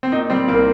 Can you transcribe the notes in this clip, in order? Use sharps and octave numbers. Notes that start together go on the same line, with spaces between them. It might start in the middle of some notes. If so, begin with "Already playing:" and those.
C4
A#2 D#4
G3 C4
C2 A#3